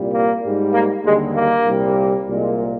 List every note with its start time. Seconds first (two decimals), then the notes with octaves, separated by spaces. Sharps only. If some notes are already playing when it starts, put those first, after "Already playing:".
Already playing: C2 A#2 G3
0.13 A#3
0.43 G#2 G3
0.73 A#3
1.04 D#2 D3 G3 G#3
1.35 A#3
1.66 C2 A#2 G3
2.28 C2 A#2 G#3